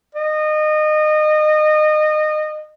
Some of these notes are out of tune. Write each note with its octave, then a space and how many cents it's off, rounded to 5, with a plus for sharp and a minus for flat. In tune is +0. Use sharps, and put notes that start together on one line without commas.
D#5 -25